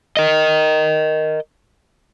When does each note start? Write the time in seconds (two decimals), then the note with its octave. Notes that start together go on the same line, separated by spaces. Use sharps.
0.17 A#4 D#5